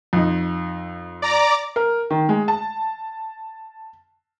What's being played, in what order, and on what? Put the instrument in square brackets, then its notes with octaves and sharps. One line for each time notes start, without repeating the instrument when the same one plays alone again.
[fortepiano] F2 D#4
[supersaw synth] D5 A#5 D6
[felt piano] A#4
D#3
G#3
A5